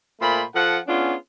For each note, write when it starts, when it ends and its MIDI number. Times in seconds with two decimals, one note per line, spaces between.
0.20 0.42 46
0.20 0.42 57
0.20 0.42 72
0.20 0.42 83
0.55 0.77 53
0.55 0.77 69
0.55 0.77 78
0.86 1.14 59
0.86 1.14 61
0.86 1.14 62
0.86 1.14 65
0.86 1.14 68